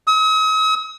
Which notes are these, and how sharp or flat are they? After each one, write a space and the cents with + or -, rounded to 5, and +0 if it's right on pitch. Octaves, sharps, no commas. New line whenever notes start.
D#6 +45